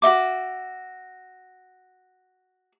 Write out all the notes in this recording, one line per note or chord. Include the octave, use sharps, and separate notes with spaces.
F#4 D#5 E5 D6